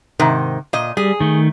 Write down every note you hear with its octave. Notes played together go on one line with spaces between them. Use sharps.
G#2 C3 D#3
A#2 D#5
G3 G#4
D#3 A3